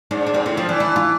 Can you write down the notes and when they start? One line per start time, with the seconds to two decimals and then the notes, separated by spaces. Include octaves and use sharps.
0.11 G#2 D4
0.27 D4
0.34 G#2 C4
0.46 A2 C4
0.57 F3 C4
0.69 E3 D4
0.80 E4
0.96 F4